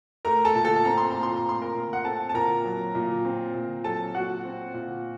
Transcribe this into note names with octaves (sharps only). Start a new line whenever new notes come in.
A3 A#4 A#5
A4 A5
A#2
A4 A5
C4 A#5
C6
A#2 A#5
C6
A#5
A3 C6
A#4 A#5
A#2
F#5
C4 A4 A5
A5
A#2 A#4 A#5
F#3
A#2
C4
A#2
F#3 A4 A5
A#2 F#4 F#5
C4
A#2